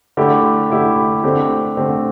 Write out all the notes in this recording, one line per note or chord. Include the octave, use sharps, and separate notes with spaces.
D3 A3 E4 G4
D3 A3 E4 G4
D3 A3 C4 G4
D3 A3 C4 G4